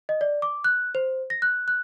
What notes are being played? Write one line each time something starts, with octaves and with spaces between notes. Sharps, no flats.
D#5
D5
D6
F#6
C5
A#6
F#6
F#6